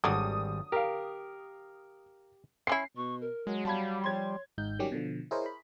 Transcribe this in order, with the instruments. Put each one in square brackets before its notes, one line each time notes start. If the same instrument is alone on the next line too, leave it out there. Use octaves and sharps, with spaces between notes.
[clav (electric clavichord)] G#1 G3 [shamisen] D3 F#3 D4 [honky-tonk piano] D#6
[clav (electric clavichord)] G4 [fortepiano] A#4 F5
[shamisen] C4 C#4 E4 [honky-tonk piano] C7
[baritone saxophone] B2 [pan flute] C#6
[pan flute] A#4
[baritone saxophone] F#3 [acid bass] G#3
[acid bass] G3 [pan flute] F5 [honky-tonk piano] A5 B5 G#6
[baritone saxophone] F3 [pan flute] C#5 [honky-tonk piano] C6 G#6
[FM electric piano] G#1 G#2 D#4 G6
D#3 F#3 G3 C#4 G4
B2 D3 F3
E4 G#4 A#4 C5 C#5 D#5
B5